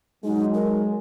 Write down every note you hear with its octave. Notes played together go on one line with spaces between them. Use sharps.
F#3 G#3 D#4
A#4